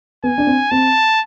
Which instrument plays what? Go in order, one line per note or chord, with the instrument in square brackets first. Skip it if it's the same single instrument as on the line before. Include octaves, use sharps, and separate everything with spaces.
[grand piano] B3 [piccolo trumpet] G#5
[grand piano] D4
C4
[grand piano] C4 [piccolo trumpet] A5